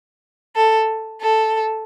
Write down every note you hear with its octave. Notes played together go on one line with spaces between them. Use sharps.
A4
A4